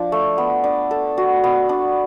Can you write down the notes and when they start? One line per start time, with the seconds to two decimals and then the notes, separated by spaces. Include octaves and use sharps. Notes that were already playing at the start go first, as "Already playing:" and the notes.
Already playing: F3 D4
0.12 A3
0.38 B3
0.64 D4
0.91 A4
1.18 F#4
1.44 B3
1.69 D4